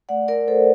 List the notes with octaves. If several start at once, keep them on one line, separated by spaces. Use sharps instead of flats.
A3 D5 F#5
A#4 D5
A3 A4 C5